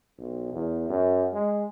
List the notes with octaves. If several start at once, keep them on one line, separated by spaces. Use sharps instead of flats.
B1
E2
F#2
G#3